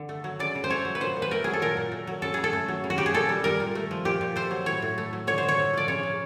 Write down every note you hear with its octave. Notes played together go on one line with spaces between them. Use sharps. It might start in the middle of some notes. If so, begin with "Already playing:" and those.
Already playing: D3
A3
F#3
C#3 D5
C#3
C5
A3 C#5
F#3
B4
A#2 C5
A#2
B4
A3 A#4
F#3 G#4
A4
A#2 A#4
A#2
A3
F#3
C#3 A4
C#3 G#4
A4
A3
F#3
C#3
F#4
C#3 G4
G#4
A#2 A4
G3
G3 A#4
A#2
A3
F3
A#2 G4
A#2
A3 C5
F#3
A2 C#5
A2
A3
F#3
D3 C#5
C5
D3
C#5
A3
F3 D5
C#3 C#5
C#3